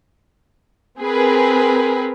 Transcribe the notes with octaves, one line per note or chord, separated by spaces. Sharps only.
C4 G#4 A#4 B4